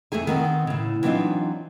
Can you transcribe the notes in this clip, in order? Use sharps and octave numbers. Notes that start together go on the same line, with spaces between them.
F2 A3 E4 G#4 G#5
D#3 B3 C4
A2 C#3
E3 F#3 C4 D4 D#4 F4